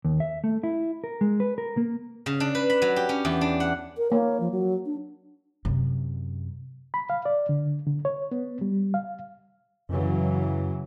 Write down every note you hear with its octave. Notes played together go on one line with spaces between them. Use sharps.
D#2
E5
A3
E4
A#4
G#3
B4
A#4
A#3
C#3
D4
B4
B5
F#3
G4
C#4
E2
D4
F#5
A#4
A#3 C#5
F3
F#3
D4
F#2 C3
B5
F5
D5
D3
D3
C#5
B3
G3
F5
F#2 C#3 E3 F#3